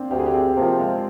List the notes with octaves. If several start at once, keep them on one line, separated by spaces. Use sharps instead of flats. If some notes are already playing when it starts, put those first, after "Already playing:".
Already playing: A#3 C4 D4
D2 G4
G#4
G4
C4
C3 F3 A#3
G#3